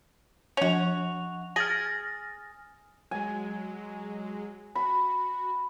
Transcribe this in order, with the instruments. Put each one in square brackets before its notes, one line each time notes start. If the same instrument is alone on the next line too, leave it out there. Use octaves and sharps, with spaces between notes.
[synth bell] F3 F7 [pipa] C#4 F#4
[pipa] G#4 [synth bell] F6 A6 A#6
[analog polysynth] F#3 G#3 [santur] G#5
[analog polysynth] F#4 [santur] B5